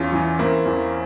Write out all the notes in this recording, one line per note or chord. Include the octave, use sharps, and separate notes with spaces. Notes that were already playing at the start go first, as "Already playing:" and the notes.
Already playing: E2 C#4 F4
E3
A#3 C4 E4
E2